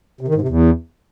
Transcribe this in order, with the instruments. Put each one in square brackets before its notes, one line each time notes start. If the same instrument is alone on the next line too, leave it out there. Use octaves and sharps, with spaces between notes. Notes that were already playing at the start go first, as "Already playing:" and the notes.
[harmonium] C3
D#3
G#2
C3
E2